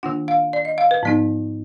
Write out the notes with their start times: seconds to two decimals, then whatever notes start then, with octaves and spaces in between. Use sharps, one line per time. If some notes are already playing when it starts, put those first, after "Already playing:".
0.03 D#3 A#3 D4 F4 F#5
0.28 F5
0.53 D5
0.65 D#5
0.78 F5
0.91 B4
1.03 G#2 F3 B3 D#4